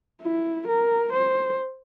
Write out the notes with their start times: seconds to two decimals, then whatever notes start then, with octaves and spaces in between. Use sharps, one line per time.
0.22 E4
0.68 A#4
1.13 C5